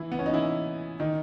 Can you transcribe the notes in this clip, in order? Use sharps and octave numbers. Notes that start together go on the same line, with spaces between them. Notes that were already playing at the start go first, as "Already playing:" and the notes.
Already playing: E3 E4
B3
C#4
D#4
E3 E4
D#3 D#4